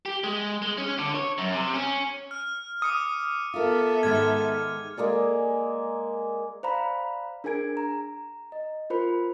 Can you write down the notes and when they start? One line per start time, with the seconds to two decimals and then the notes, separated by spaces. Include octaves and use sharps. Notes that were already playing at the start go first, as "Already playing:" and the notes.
0.06 G4
0.24 G#3
0.62 G#3
0.78 C#4
0.99 D3
1.15 C#5
1.38 F#2
1.54 C3
1.74 C#4
2.31 F6
2.82 D6 D#6 C#7 D#7
3.54 B3 F4 A4 A#4 E5
4.03 G#2 D#3 G#3 F6 G#6
4.97 G#3 A#3 G#4 D5
6.63 C5 D5 F5 A#5 B5
7.44 D4 G#4 A#4 G#5 G#6 D7
7.77 A#5
8.52 D#5
8.90 F4 A#4 C5 B5